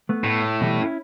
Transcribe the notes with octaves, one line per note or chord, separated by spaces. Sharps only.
A3 B3
A2
B2 E3 G3
C#4 E4